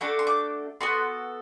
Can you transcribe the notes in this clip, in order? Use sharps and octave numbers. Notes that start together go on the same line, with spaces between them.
A3 D4 F#4 A4 D6
C6
D6
B3 F#4 A4 C6